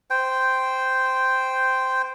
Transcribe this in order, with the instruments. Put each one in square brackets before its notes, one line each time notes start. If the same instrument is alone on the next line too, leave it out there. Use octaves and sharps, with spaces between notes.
[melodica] C5 G5